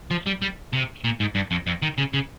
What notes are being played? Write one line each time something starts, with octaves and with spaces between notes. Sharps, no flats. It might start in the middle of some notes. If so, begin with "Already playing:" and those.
F3
G3
G3
C3
A#2
G#2
G2
F2
F2
D#3
C#3
C#3